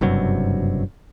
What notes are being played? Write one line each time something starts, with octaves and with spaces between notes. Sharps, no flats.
F#1 G2 C3 F#3